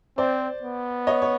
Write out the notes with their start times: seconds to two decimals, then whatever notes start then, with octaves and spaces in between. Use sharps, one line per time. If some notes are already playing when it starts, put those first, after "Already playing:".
0.17 C4 C5 D5
0.62 B3
1.07 C#5 D#5
1.22 C#5